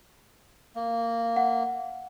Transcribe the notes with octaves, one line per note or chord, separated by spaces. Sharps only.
A#3
F#5